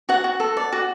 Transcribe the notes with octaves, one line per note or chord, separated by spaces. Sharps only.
F#4 F#5
F#4
A4
D5
F#4